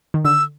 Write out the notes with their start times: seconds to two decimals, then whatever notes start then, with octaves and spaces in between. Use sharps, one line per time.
0.14 D#3
0.25 D3 E6